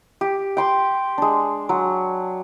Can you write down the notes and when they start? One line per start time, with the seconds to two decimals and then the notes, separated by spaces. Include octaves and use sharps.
0.21 G4
0.57 G5 C6 D6
1.18 G#3 D4
1.69 F#3